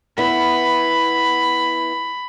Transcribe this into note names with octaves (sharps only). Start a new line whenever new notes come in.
B3 E4 B5